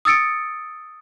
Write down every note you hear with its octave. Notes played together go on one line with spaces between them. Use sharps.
D#6 E6 A6 C#7 D7